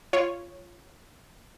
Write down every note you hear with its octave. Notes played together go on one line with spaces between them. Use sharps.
F4 C#5